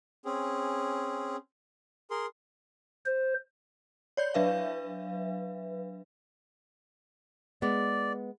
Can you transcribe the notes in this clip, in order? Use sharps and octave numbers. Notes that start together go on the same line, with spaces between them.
C4 C#4 G#4
G#4 A#4 C6
C5
C#5 D5 G6
F#3 D4 B4 E5 F5
G#3 B3 D5